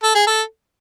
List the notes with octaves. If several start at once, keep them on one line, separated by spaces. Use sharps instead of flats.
A4
G#4
A4